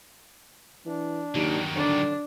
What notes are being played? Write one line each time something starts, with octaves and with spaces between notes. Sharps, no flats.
E3 D4
D#2 D#3 F#3
D3 D4